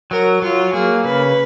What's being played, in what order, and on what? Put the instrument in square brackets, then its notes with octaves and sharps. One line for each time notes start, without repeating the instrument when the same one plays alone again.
[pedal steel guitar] F#3 [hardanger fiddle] A#4
[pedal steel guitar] F#3 [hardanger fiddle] F4
[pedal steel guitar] A#3 [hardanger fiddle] G#4
[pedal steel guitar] C#3 [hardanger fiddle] B4